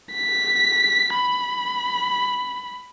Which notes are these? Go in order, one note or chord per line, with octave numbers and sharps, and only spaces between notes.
B6
B5